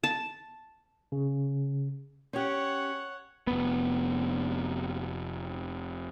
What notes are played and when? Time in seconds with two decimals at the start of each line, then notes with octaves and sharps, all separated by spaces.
0.03 A5
1.12 C#3
2.33 C#4 G4 C#5 F#5
3.47 F1 B3